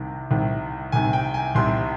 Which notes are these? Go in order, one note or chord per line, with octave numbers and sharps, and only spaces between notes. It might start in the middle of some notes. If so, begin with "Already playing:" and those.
Already playing: C2 C3 D#3
C2 C3 D#3
C2 C3 D#3 G#5
G5
G#5
C2 C3 D#3 C6